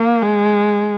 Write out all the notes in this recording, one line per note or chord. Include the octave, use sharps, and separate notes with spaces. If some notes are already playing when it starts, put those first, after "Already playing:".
Already playing: A#3
G#3